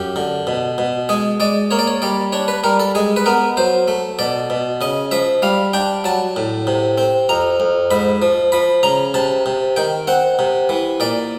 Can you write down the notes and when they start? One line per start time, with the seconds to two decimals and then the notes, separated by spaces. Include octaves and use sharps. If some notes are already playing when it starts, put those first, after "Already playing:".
Already playing: F#2 G4
0.16 D3
0.47 B2
0.78 B2
1.09 G#3 G#4
1.40 G#3 D5
1.71 A#3 C#5
1.79 D5
1.87 C#5
2.02 G3 D5
2.32 D4 C#5
2.48 B4
2.64 G3 A#4
2.80 A4
2.95 G#3 G#4
3.16 B4
3.26 B3 A#4
3.57 F#3 C5
3.88 A3
4.19 B2 D5
4.50 B2
4.81 C#3 D#5
5.11 F3 E5
5.42 G3 F5
5.73 D4 G5
6.04 F#3 A5
6.36 A2
6.67 C3
6.98 C4
7.29 F2 A#5
7.60 F2
7.91 G#2 B5
8.22 F3
8.52 F3 B5
8.83 C#3 A#5
9.14 C3 A5
9.46 C3
9.76 D#3 G5
10.07 C4 F#5
10.39 C3
10.69 E3
11.00 A#2 D5